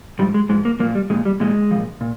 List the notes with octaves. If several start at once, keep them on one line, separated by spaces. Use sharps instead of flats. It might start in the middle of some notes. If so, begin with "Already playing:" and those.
G#2 F3 G3
G#3
G#2 F3 G#3
A#3
A#2 F3 A#3
G3
A#2 F3 G#3
G3
A#2 F3 G#3
A#2 F3
A#2